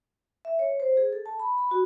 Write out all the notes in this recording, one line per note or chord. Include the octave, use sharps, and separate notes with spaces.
E5
C#5
C5
G#4
A4
A5
B5
B5
F#4